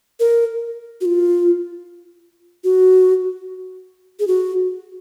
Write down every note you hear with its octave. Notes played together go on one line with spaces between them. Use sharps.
A#4
F#4
F4
F#4
G#4
F#4